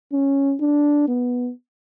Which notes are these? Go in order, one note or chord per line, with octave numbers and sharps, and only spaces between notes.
C#4
D4
B3